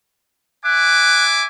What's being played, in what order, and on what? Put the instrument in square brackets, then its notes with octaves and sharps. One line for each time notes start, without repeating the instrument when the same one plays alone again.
[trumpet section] E5 G#5 D6 [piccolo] F#6